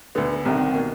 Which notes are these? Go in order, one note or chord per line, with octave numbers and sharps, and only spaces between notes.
D2 D3 B3
C2 C3 D#3
B2 A#3